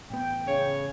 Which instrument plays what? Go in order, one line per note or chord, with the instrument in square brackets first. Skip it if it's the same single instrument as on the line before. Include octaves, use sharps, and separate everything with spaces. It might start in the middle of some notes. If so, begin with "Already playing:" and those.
[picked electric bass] A1 B3 [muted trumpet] G5
[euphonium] C#3 [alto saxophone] C#5